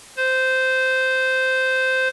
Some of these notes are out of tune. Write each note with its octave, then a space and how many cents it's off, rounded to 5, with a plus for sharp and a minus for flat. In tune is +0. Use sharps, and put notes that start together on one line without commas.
C5 -10